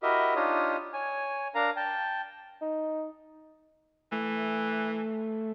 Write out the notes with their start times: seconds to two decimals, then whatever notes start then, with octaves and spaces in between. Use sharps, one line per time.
0.03 E4 F#4 G4 A#4 D#5 E5
0.36 D4 D#4 F4 G4 C#5 D#6
0.93 C#5 G#5
1.55 D4 A#4 F5 A#5
1.76 G5 A5
2.61 D#4
4.12 E3 A3